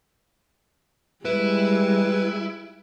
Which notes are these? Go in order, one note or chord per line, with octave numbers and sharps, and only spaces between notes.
G3 G#3 E4 B4